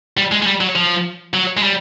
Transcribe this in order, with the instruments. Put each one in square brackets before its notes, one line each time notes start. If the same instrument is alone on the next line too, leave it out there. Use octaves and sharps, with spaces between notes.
[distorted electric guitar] G3
G#3
G#3
G3
F#3
F3
F#3
G#3
G3